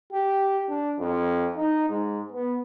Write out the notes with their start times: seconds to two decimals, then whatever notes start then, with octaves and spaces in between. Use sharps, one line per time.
0.13 G4
0.70 D4
0.99 F2
1.56 D#4
1.89 G#2
2.32 B3